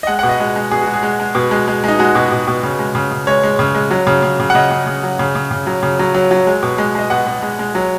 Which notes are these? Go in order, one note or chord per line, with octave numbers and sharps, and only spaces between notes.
D#5
G#3 F#5
B2 F#5
D#5
G#3
G#3
B2 G#4
G#3 F#4
G#4
G#3
G#3
B2
G#3
G#3
G#3 D#4
G#3 F#4
B2
B2
B2
C#3
G#3
C#3
C#3
G#3 C#5
G#3
C#3
G#3
F#3
C#3
C#3
C#3
F#5
C#3 D#5
C#3
C#3
F#3
C#3
C#3
C#3
F#3
C#3
F#3
F#3
F#3
G#3
B2
G#3
G#3 D#5
B2 F#5
B2
G#3
G#3
F#3